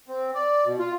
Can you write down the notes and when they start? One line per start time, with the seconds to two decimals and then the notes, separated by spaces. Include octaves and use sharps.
0.08 C4
0.34 D5
0.65 B2
0.79 F4